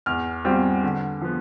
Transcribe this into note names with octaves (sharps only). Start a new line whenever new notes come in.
E2 F6
B2 G3 C4 F4
D3
F3 B3